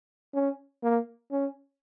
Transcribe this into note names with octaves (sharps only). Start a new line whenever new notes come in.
C#4
A#3
C#4